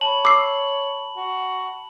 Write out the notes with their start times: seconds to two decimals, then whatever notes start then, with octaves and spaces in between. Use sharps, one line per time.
0.01 C#5 A5 B5 F#7
0.25 D6 E6 C7
1.17 F#4